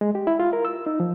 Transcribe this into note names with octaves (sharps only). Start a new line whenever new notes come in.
G#3
G4
E4
F4
A#4
E6
D#4
F3